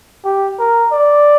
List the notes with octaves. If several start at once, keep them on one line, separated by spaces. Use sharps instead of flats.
G4
A#4
D5